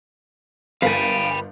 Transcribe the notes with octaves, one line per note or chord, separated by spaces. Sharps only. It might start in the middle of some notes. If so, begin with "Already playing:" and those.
G1 A#4 F5 G5 G#5 B5 A6